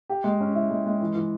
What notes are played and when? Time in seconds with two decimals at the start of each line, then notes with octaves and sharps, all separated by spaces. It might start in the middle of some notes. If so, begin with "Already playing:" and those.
0.09 G4
0.24 G#3
0.40 C#4
0.54 E4
0.70 G#3
0.86 G#3
1.01 E3
1.16 E3